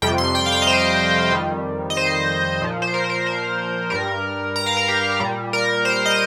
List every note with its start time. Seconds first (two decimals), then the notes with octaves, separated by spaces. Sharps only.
0.02 F2 C3 G3 G5
0.18 C6
0.35 G5
0.46 F5
0.52 G5
0.56 F5
0.62 D#5
0.67 C5
1.32 F2 D#3 G3
1.90 D#5
1.97 C5
2.61 A#2 F3
2.82 C5
2.94 A#4
3.04 C5
3.10 A#4
3.27 C5
3.90 G2 G3 A#4
4.56 A#5
4.66 F5
4.77 A#4
4.88 G4
5.20 A#2 G3
5.53 A#4
5.85 C5
6.06 D#5